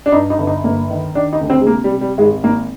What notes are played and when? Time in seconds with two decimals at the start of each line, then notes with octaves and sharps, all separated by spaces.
0.06 D4
0.12 G2 D#4
0.30 D#4
0.38 G1
0.47 D#4
0.64 G1 A#3
0.90 D#3
1.15 D#3 D4
1.33 D#4
1.41 D2
1.50 C4
1.61 G#3
1.67 C3 A#3
1.84 G3
1.93 C3
2.01 G3
2.18 G#1 G#3
2.44 G#1 A#3